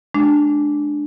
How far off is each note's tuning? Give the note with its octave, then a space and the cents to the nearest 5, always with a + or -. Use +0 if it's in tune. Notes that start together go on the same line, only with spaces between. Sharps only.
G#3 +25 D4 +5